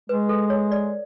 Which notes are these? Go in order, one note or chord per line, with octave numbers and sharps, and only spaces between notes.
G#3 B4
A4
C#5
D5